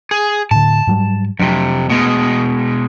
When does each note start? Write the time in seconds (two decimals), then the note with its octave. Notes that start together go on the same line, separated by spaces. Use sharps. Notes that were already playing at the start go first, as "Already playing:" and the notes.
0.11 G#4
0.51 A2 D3 A5
0.87 G#2 F#3 G3
1.39 F2 C3 F#3 D4
1.90 B2 G#3 A3 B3